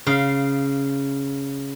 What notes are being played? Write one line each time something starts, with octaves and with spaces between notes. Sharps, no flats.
C#3 F5